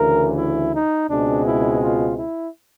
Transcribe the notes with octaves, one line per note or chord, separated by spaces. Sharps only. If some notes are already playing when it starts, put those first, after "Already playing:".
Already playing: D2 C#3 E3 A#4
E4
D#4
C#2 B2 G#3 C4 D4
E4
F4
E4